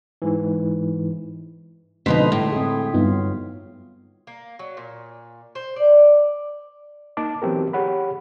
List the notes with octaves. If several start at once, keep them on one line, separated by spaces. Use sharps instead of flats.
G#2 E3
F2 B2 D3 G#3 D#4 B5 C6 B6
A2
C4 G#4
G2 F#3 B3 D#4 F4
A#3
F#3
A#2
C5
D5
A#3 D#4 A5 D6
E3 F#3 B3 C4 G4 A#4
G4 G#4 C#5 F#5 B5